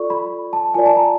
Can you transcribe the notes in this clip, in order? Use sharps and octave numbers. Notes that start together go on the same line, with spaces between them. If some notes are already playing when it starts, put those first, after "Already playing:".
Already playing: F4 A4 D5 C#6
B5
A5
F4 A#4 D5 G#5
A5
A#5